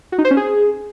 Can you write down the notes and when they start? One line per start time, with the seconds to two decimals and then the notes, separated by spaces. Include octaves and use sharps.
0.12 F#4
0.18 D#4
0.25 C5
0.31 C#4
0.37 G#4